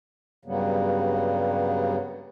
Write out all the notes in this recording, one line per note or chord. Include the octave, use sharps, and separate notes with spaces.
G2 C#3 F#3 G3 A#3 B3